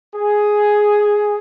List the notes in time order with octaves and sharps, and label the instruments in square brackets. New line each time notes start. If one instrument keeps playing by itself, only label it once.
[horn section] G#4